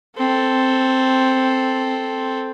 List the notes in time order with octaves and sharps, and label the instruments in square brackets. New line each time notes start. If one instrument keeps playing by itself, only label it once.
[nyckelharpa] C4 A4